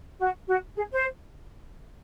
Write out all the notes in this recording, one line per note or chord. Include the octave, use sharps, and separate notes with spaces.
F#4
F#4
G#4
C5